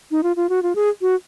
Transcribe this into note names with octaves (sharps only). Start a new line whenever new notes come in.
D#4
F4
F4
F#4
F4
G#4
F#4